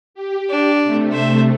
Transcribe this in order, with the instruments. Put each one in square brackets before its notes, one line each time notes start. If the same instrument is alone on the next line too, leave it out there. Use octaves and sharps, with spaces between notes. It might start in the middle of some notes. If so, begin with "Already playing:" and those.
[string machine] G4
[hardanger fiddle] D4
[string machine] C3 A3
[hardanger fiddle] C5 E5